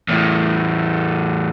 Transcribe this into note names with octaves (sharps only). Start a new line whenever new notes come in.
E2 A2